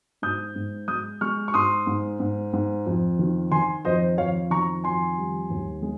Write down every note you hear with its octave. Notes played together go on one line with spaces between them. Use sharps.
G#2 D#6 G6
G#2
G#3 D#6 G6
G#3 C#6 F6
C#6
G#2 C6 D#6
G#2
G#2
G#2
F2
D#3
D#3 G#5 C6
F2 C5 D#5
F2 C#5 F5
D#3 A#5 C#6
F2 G#5 C6
G3
D#2
G#3